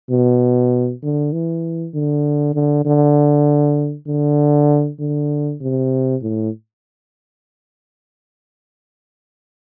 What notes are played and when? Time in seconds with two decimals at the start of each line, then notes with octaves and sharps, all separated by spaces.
0.10 B2
1.03 D3
1.32 E3
1.94 D3
2.54 D3
2.85 D3
4.07 D3
5.00 D3
5.61 C3
6.22 A2